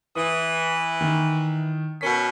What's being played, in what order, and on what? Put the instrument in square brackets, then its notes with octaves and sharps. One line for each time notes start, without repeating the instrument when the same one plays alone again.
[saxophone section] E3 [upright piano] D#6
[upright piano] D#3
[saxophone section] B2 C#4 A#4 [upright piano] B6